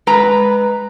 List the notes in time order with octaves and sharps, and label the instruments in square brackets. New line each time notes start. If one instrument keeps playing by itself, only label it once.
[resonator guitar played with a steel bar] G#3 B4 A#5